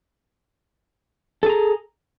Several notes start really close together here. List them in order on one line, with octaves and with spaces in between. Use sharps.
A4 G#4 A#5